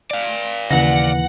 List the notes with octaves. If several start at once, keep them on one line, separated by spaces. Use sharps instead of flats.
D5 F5
D#2 C#3 E3 F#5 A#6